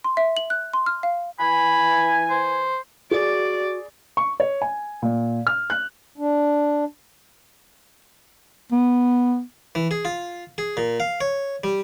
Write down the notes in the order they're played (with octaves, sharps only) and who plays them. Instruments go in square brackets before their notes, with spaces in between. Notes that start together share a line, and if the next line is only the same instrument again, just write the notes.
[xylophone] C6
E5
F#7
F#6
C6
F6
F5
[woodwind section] E3 G#5 [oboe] B5
[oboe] C5
[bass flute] F#4 [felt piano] G#4 [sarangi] D5
[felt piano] C#6
C#5
G#5
A#2
F6
F#6
[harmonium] D4
[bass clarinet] B3
[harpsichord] E3
G#4
F4
G#4
A#2
F5
C#5
G3